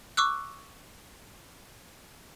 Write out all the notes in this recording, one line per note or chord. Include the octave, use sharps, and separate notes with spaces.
C#6 D6 E6 F#6